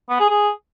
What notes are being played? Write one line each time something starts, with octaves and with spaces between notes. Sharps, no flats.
B3
G#4
G#4